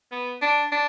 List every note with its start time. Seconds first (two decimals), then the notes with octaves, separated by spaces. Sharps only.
0.12 B3
0.42 D4
0.72 D4